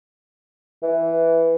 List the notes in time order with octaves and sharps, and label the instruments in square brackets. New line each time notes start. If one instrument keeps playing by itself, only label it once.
[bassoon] E3